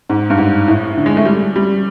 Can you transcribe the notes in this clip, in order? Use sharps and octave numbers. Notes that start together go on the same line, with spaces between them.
G#2
G2
G#2
A2
D3
G#3
A3
G3
G3